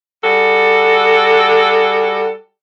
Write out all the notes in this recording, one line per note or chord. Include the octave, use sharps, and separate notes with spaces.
G3 F#4 G#4 A4